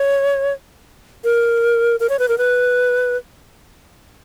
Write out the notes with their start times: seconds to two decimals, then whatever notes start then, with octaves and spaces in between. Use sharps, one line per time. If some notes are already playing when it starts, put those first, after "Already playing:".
Already playing: C#5
1.24 A#4
2.00 A#4
2.09 C#5
2.19 B4
2.28 A#4
2.38 B4